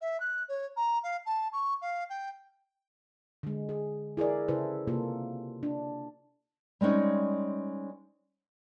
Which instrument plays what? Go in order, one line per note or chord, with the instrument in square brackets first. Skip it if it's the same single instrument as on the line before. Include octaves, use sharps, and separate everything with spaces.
[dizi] E5
F#6
C#5
A#5
F5
A5
C#6
F5
G5
[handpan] D3 G#3
G#4
E4 G#4 A#4 D5
C#3 E4 A4 B4 C5
C3 A#3 F4 A4
D4
[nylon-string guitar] G3 G#3 C4 C#4 D#4